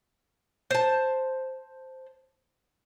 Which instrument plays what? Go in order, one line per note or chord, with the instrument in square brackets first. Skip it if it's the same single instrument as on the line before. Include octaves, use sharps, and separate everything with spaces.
[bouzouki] C5 A5